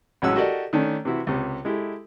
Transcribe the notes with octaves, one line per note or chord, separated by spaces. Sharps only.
A1 F#3 G#3 C#4 F#5 E6
F#4 G4 A4 A#4 D5 D#5
D#3 A3 C#4 D4
C3 E3 E4 F#4
C#2 C3
G#3 E4 G4 A4